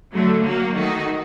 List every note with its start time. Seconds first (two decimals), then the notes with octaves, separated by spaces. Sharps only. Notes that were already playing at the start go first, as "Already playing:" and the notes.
0.12 D3 F#3 A3
0.43 F#3 A#3 F#4
0.74 D#3 A3 D#4 F#4